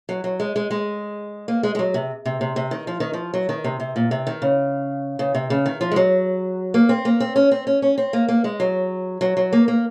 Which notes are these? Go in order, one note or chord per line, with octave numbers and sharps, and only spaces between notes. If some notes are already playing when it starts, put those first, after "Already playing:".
F#3
F#3
G#3
G#3
G#3
A#3
G#3
G#3
F#3
C3
C3
C3
C3
D#3
F3
D#3
F3
F#3
D#3
C3
C3
A#2
C3
D#3
C#3
C#3
C3
C#3
D#3
F3
G#3
F#3
A#3
C4
A#3
C4
C#4
C4
C#4
C#4
C4
A#3
A#3
G#3
F#3
F#3
F#3
A#3
A#3